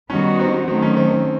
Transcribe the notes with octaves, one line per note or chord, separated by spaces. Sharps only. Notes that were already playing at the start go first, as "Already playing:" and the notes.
D#3 G3 B3 C#4 D#4 F#4
C4
D#3 F#3 A3 C4
C#4
C4
C4